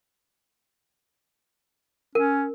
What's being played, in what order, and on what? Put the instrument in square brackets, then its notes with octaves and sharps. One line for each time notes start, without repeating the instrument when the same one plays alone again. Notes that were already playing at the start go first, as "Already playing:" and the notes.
[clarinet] C#4 [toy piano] A#4